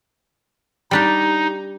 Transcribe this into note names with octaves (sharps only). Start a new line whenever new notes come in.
G3 D4 D#4 G4